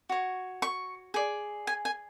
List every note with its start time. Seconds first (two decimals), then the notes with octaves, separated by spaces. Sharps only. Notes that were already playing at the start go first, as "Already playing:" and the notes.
0.09 F#4 C#5
0.62 C#6
1.14 G#4 D5
1.67 G#5
1.85 G#5